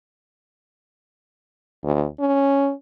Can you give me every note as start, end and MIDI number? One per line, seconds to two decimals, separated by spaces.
1.84 2.06 38
2.20 2.72 61